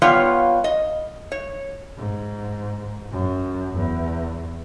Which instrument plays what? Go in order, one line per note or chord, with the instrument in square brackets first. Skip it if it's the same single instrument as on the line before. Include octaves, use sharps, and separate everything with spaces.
[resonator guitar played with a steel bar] G3 B3 F4 C#5 F5
D#5
C#5
[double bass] G#2
F#2
E2